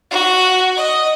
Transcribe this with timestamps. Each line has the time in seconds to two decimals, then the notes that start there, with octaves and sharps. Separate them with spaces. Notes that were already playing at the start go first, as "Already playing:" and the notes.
0.10 F#4
0.76 D#5